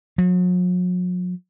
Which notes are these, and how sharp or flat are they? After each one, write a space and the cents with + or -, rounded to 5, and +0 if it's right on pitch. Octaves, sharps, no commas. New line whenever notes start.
F#3 -45